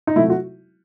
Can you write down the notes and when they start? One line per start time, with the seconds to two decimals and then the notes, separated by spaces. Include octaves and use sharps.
0.07 D#4
0.16 C3 F#3 A3 E4
0.30 F#4